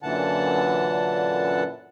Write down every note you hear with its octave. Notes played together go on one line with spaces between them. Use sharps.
F#2 A#2 D3 E3 F#5 A5